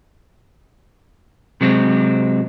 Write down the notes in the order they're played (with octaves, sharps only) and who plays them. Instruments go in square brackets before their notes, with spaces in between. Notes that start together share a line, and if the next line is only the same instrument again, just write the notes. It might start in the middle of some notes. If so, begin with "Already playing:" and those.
[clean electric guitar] C3 F#3 G#3 C4